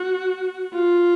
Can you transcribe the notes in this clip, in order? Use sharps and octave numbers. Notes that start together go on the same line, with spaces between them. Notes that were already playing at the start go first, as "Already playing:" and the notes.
Already playing: F#4
F4